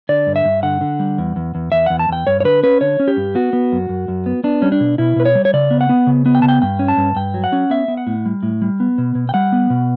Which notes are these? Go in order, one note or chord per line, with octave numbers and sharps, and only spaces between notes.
D3 D5
G2
E5
G2
D3 F#5
D3
G3
E2
E2
E2
E2 E5
E2 F#5
A5
E2 G5
G2 C#5
C#5
D3 B4
C#4 B4
D3 C#5
C#4
G4
G2
B3 F#4
B3
F#2
F#2
F#2
B3
B3 D4
G3 C#4
D4
B2
B2 E4
B2 B4
C#5
G3
C#5
C#3 D5
B3
F#5
B3
C#3
B3
G5
C#3 A5
G5
G2 G5
C#4
A5
G2
G2 G5
F#3
F#5
C#4
B3 E5
B3
F#5
A2
G3
A2
G3
B3
B2
B2
G5
G3 F#5
B3
B2